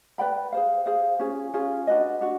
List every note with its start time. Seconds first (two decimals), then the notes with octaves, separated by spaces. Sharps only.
0.18 B4 D5 G5 B5
0.52 G#4 C5 F5
0.86 G#4 C5 F5
1.19 C#4 F4 G#4
1.54 C#4 F4 G#4
1.87 D4 F#4 B4 D#5
2.21 D4 F#4